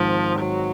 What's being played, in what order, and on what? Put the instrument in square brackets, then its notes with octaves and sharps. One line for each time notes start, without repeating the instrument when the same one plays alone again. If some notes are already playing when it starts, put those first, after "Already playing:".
Already playing: [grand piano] G#2 D#3 G#3 C4 [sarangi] F3
[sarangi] F#3